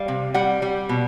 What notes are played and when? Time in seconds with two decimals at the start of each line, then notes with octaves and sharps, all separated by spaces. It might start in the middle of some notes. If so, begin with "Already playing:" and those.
Already playing: G3 F5
0.08 C3
0.34 G3 F#5
0.62 G3
0.89 B2